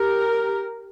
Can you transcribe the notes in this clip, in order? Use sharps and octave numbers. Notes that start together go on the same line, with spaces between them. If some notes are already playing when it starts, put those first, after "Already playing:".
Already playing: G4 A#4